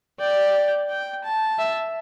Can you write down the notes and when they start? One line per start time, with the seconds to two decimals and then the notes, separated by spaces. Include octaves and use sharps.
0.20 D5 G5
0.90 G5
1.24 A5
1.59 E5